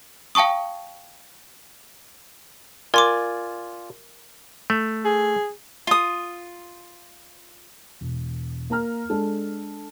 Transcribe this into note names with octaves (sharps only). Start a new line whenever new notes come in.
F5 G5 A5 C#6 D#6
F4 A#4 D5 G#5 C6 D6
A3
G#4
F4 D#6
E1
A#3 A#4 A#5 F6
G#3 D4 A4